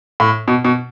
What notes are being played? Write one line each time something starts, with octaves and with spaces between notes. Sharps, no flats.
A2
B2
B2